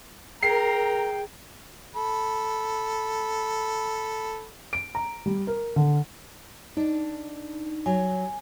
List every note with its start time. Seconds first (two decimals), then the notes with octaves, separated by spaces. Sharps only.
0.43 G#4 A#4 G5 C7
1.96 A4 B5
4.73 D7
4.95 A#5
5.26 G3
5.47 A#4
5.76 D3
6.77 D4 D#4
7.86 F#3 G#5